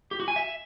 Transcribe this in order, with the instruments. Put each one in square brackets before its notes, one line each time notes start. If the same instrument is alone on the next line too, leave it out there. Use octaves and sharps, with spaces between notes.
[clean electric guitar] G4
F#4
G#5
E5